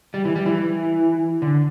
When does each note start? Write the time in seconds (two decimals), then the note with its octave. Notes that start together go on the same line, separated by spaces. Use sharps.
0.14 G3
0.25 E3
0.36 G3
0.46 E3
1.42 D3